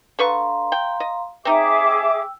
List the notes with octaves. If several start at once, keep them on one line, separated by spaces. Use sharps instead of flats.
D3 B4 F5 A#5 C6 C#6
G5
D#5
C4 D#4 G#4 E5 G5 D6
G5 E6